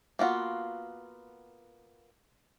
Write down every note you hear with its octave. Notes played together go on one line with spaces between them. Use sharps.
A#3 B3 F4 F#4